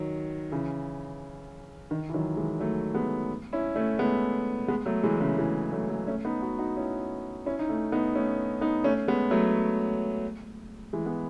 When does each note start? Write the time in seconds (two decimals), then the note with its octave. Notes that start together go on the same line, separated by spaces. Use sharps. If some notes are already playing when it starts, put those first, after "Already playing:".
Already playing: D#3 F#3
0.52 C#3 E3
1.91 D#3
2.09 E3
2.14 D#3 F#3
2.37 E3 G#3
2.60 F#3 A3
2.95 G#3 B3
3.53 C#4 E4
3.76 A3 C#4
3.99 G#3 B3
4.68 G#3 B3
4.86 F#3 A3
5.03 E3 G#3
5.20 C#3 E3
5.38 E3 G#3
5.73 F#3 A3
5.90 F#3 A3
6.07 A3 C#4
6.25 B3 D#4
6.42 D#4 F#4
6.59 D#4 F#4
6.76 C#4 E4
7.46 C#4 E4
7.59 D#4
7.69 A3 C#4
7.92 B3 D#4
8.15 A3 C#4
8.61 B3 D#4
8.84 A3 C#4
9.08 G#3 B3
9.31 F#3 A3
10.93 E3 G#3
11.06 B3